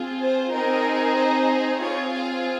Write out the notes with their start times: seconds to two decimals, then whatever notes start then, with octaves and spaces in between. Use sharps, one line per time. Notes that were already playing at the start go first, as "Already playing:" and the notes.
Already playing: C4 F4 G#4
0.20 C5
0.51 C4 D#4 G#4 A#4
1.16 C5
1.80 C4 F4 G#4 C#5
2.12 F5